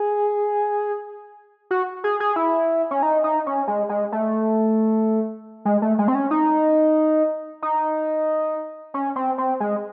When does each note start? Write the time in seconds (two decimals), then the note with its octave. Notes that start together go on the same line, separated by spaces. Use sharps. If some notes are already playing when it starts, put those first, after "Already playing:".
Already playing: G#4
1.71 F#4
2.04 G#4
2.20 G#4
2.36 E4
2.91 C#4
3.03 D#4
3.24 D#4
3.46 C#4
3.67 G#3
3.89 G#3
4.12 A3
5.65 G#3
5.82 A3
5.99 G#3
6.08 C4
6.15 C#4
6.31 D#4
7.62 D#4
8.94 C#4
9.16 C4
9.38 C4
9.60 G#3